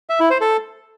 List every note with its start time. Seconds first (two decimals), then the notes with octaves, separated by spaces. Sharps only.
0.10 E5
0.20 E4
0.30 C5
0.41 A4